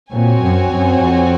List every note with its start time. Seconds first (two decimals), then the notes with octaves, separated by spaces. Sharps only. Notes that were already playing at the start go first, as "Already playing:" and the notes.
0.12 A#2 C4 F#4 C#5 G#5
0.42 F#2
0.71 F#2
1.00 F2